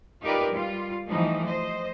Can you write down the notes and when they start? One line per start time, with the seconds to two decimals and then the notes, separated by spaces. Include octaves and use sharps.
0.22 D#4 F4 G4 A#4 B4 D5
0.53 G3 F4
1.09 E3 F3 G3 A3 D#4
1.46 C5 D#5